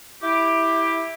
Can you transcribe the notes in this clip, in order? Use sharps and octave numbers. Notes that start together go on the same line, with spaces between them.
E4 G4